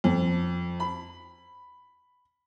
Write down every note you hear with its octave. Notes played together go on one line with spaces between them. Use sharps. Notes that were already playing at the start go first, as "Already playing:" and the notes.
F2
B5